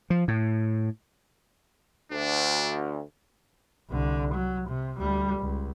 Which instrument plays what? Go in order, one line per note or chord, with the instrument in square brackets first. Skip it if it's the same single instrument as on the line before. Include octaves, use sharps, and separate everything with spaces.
[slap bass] F3
A2
[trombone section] D2 [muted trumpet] D4
[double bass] C2 D3
F#3
C3
D2 G3
C#2